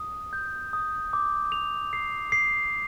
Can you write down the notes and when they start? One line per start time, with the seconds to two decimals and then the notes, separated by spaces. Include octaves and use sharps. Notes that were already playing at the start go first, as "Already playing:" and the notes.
Already playing: D#6
0.33 G6
0.73 D#6
1.13 D6
1.52 F7
1.93 C7
2.32 C7